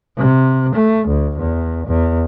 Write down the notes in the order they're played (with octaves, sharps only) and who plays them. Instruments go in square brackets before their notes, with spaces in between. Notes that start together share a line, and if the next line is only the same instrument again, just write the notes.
[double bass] C3
A3
D2
E2
E2